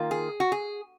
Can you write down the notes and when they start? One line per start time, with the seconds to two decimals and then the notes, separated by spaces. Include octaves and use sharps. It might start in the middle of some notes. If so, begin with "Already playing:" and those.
Already playing: D#3 A#3 F4
0.11 G#4
0.40 F#4
0.52 G#4